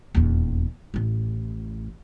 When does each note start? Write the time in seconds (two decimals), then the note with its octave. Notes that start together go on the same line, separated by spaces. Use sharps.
0.15 D#1 E2
0.94 A1 A2